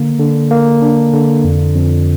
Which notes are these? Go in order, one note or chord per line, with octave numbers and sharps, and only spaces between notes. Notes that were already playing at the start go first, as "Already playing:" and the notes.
Already playing: D3 A#3
D3
A#3
D4
D3
F2
F2